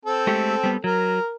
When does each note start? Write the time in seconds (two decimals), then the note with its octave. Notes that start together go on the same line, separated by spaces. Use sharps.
0.05 C4 A4
0.27 G#3 A3 G4
0.63 G3 B3
0.84 F#3 A#4